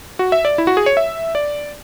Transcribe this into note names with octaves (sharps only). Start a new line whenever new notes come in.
F#4
E5
D5
E4
F#4
G#4
C#5
E5
D5